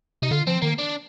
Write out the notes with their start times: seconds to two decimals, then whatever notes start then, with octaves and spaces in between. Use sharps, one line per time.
0.22 C3 D#4
0.31 D3 F4
0.47 F3 C4
0.62 D#3 A#3
0.78 D4